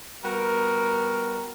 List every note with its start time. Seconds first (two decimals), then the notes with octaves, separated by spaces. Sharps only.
0.24 G3 B3 F#4 A#4